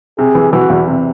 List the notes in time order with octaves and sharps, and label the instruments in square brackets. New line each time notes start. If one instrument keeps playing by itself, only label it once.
[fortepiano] C3 [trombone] G#4
[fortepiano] E3
[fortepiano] E3 [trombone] F#4
[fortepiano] E2
C3